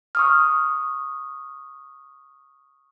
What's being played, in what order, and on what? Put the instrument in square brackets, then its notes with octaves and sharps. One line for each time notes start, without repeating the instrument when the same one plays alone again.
[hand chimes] C#6 D#6 F6